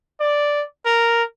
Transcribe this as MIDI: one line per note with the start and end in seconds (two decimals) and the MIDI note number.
0.20 0.62 74
0.86 1.23 70